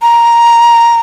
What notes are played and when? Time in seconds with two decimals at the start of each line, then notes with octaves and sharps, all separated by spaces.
0.02 A#5